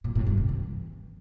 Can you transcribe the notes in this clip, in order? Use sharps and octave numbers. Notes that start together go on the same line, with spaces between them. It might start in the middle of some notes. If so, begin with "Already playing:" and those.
A#2
A2
G2
C3
E3